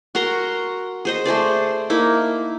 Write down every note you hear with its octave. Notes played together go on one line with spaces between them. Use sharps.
F#4 A#4 A#5 C6
G#4 C5 D#5
A3 G#4 C5 D5
A#3 D#4 E4